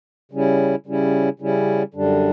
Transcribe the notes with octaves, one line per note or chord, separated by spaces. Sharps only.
C#3 G3 C#4 E4
C#3 G3 C#4 E4
C#3 G3 C#4 E4
F#2 D3 G3 D4